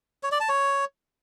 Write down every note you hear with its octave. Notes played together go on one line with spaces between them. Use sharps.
C#5
D5
A5
C#5